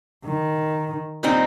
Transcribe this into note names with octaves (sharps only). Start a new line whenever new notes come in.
D#3
A#2 G3 C4 D#4